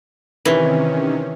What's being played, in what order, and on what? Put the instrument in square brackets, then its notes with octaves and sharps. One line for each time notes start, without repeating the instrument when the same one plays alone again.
[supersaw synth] C3 D#3 C#4 [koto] E3